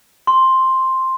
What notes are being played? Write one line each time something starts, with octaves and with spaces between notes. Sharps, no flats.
C6